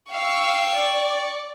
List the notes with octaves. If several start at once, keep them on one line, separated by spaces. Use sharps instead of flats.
F5 G5 C#6 E6
D5